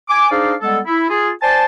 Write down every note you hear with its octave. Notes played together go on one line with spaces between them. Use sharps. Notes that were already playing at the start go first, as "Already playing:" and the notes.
G#5 D6
D4 D#4 G#4 C5 D5 F5
G3 G#3 B3 A4
E4
F4 G#4
C5 D5 G#5 A5